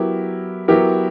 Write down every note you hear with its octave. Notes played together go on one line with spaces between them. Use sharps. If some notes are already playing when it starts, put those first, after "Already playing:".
Already playing: F#3 B3 E4 G4 A#4
F#3 B3 E4 G4 A#4